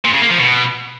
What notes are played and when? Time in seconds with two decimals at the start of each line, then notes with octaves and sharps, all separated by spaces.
0.04 A#2
0.13 C#3
0.22 A#3
0.30 F3
0.39 B2